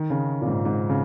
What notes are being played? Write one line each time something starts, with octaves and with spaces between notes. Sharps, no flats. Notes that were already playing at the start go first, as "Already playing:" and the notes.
Already playing: D#3
C#3
A#2
G#2
G#2
C#3